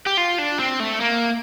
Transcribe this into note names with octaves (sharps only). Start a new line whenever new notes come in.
G4
F4
D4
C4
A3
A#3